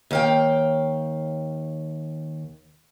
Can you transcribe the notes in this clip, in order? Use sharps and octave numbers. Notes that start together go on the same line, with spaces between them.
D#2 F5 G5